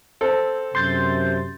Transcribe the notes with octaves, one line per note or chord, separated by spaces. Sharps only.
C4 A4
F#2 C3 C6 G6 A6